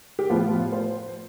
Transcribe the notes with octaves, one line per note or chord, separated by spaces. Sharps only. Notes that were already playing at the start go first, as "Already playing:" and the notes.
G4
A2 F3 B3 F4
C5